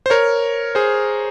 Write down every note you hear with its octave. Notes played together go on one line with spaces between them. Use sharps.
C5
A#4 C#5
G#4 C5